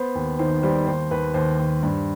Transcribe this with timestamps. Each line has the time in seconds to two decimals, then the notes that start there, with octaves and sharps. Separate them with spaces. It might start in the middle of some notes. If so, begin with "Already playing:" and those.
Already playing: B3 C5
0.15 D#2
0.39 D#3 C5
0.63 G3 C5
0.87 D#2 C5
1.11 D#2 B4
1.34 D#2 C5
1.59 D#2
1.83 G2